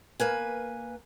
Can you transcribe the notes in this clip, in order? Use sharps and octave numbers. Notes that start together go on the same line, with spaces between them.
A#3 B4 G#5